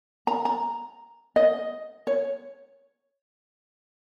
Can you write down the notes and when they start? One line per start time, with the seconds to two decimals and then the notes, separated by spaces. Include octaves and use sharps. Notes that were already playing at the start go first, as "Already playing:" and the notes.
0.27 A#5
0.45 A#5
1.36 D#5
2.07 C#5